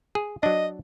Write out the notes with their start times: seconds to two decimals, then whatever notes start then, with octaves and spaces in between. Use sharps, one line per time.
0.15 G#4
0.43 F#3 D4 D#5